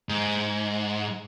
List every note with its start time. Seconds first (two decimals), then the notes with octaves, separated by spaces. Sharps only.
0.09 G#2